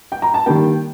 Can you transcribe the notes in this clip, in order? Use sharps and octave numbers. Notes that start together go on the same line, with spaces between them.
G5
A#5
A5
D#3 G3 A#3 G5